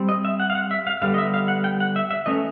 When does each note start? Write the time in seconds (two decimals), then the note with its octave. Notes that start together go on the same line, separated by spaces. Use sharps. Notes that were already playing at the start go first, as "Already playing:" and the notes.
Already playing: G3 C4
0.09 D#5
0.25 E5
0.40 F#5
0.50 F5
0.55 F#5
0.71 E5
0.87 F5
1.02 D3 G3 B3 F5
1.14 D#5
1.18 E5
1.34 F5
1.48 F#5
1.64 G5
1.80 F#5
1.96 E5
2.11 E5
2.26 E3 A3 C#4 D#5